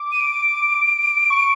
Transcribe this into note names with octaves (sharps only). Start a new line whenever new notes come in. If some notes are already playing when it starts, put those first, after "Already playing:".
Already playing: D6
D#7
D7
C#6